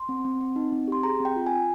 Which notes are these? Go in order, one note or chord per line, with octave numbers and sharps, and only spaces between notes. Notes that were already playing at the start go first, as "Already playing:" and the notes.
Already playing: C6
C4
C4
C4
D#4
C4
G4 C6
G#4 A#5
C4
G5
F4
F4 G#5